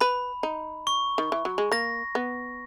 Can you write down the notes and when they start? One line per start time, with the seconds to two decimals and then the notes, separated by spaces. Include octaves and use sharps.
0.01 B4 B5
0.43 D#4
0.87 C#6
1.18 D#3
1.32 E3
1.45 F#3
1.58 G#3
1.72 A#3 A#6
2.15 B3